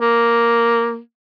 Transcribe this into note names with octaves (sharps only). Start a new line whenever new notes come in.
A#3